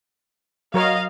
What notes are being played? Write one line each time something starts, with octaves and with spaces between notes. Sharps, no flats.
F#3 A#4 C#5 D#5 F5